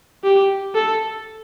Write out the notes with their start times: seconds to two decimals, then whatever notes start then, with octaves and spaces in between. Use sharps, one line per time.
0.24 G4
0.75 A4